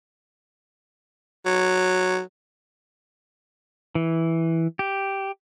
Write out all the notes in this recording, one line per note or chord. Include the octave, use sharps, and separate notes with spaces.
F#3
E3
G4